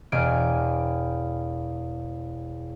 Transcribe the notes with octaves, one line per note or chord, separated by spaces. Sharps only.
E1 G#5 F6 D7